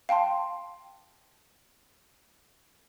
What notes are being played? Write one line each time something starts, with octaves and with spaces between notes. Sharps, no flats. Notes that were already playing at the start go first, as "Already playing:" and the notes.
F5 G5 A5 C6